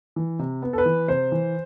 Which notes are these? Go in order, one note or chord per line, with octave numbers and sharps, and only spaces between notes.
E3
C3
B3
A4
B4
E3
C3 C5
E3